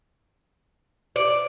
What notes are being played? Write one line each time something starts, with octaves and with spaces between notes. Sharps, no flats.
D5